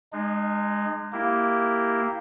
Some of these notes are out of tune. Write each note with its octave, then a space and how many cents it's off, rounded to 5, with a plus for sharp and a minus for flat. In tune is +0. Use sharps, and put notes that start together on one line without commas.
G#3 -5 D#4 -45
A#3 +0 E4 +0 G4 +0